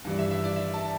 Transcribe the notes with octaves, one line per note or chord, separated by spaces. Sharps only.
G2 E3 G3 D5
E5
E5
D5
E5
A5